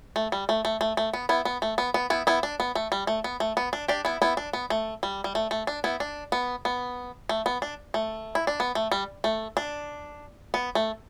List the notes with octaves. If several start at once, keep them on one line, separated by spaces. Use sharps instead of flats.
A3
G3
A3
A3
A3
A3
B3
B3 E4
B3
A3
B3
B3
B3 E4
B3 E4
D4
B3
A3
G3
A3
B3
A3
B3
D4
D4 G4
B3 E4
B3 E4
D4
B3
A3
G3
G3
A3
A3
D4
B3 E4
D4
B3
B3
A3
B3
D4
A3
E4
D4
B3
A3
G3
A3
D4
B3
A3